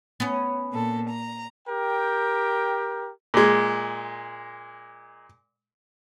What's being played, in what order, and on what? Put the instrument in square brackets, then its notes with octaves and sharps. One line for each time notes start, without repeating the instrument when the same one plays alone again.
[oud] B3 C#4
[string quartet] A#2 A4
A#5
[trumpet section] G4 A#4 G5
[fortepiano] A#2 G#3